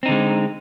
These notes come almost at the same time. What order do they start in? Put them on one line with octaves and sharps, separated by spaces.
C4 D#4 D3 G#3